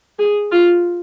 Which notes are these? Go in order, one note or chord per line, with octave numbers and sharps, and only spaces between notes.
G#4
F4